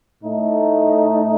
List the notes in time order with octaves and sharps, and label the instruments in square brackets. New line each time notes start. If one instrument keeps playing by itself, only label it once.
[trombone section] A2 A3 D#4